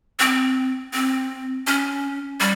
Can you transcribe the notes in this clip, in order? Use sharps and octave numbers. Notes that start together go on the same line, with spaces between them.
C4
C4
C#4
G3